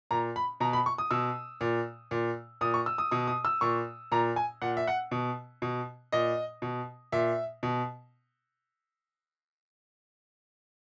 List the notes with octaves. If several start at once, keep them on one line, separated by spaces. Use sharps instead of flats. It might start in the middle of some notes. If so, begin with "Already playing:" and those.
A#2 A#5
B5
B2 A#5
B5
C#6
D#6
B2 E6
A#2
A#2
A#2 D#6
C#6
E6
D#6
B2 D#6
D#6
E6
A#2 C#6
A#2 A#5
G#5
A#2 F#5
E5
F#5
B2
B2
A#2 D#5
B2
A#2 E5
B2